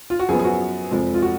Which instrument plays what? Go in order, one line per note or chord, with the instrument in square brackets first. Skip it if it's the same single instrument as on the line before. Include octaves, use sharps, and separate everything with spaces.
[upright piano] F4
F#4
F#2 F3 B3 G#4
G#4
F#4
F1 F2 F3 G#3
F4
F#4